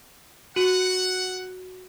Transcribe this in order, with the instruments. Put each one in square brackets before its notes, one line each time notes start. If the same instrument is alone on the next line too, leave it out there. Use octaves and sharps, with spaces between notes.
[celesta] F#4 D#7 F#7 [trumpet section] F#5